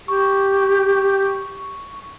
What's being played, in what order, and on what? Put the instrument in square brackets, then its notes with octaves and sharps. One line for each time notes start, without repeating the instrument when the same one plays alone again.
[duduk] G4 [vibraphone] C#6